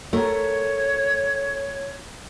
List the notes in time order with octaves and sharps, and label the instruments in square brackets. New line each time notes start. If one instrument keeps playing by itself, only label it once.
[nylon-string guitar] A3 A#4 [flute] C#5